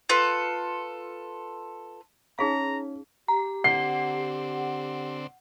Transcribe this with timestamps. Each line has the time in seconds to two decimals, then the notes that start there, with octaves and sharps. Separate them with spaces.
0.09 F4 A4 B4
2.39 C#4 D#4 G#4 F5 A#5
3.28 G4 A#5
3.64 D3 C4 F#5 C7